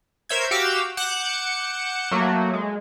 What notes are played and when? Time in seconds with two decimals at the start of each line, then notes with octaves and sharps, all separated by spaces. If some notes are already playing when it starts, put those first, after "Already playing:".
0.29 A#4 C5 C#5 E5 G6 G#6
0.51 F#4 G4 F5 D6 E6
0.97 F#5 D6 F#6 G6 C#7 E7
2.11 F#3 A3 A#3 F#4
2.53 G#3